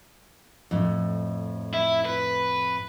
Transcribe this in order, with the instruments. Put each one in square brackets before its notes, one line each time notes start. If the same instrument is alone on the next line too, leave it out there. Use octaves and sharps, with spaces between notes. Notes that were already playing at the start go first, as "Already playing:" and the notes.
[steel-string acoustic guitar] F2 A2
[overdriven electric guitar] E4
B4